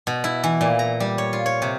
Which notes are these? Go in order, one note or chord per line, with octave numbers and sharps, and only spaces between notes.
B2
E4
E3
A#2
A#5
G3
C#5
F4
C#5
C3